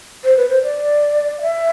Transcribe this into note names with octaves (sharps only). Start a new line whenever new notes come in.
C5
B4
C5
D5
F5
E5